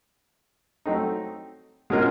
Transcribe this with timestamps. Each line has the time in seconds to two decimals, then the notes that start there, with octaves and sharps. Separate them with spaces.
0.86 F#3 A3 C4 D#4
1.90 B2 G#3 C#4 F4 A#4